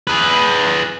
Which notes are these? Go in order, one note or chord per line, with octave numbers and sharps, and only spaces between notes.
G#4 B4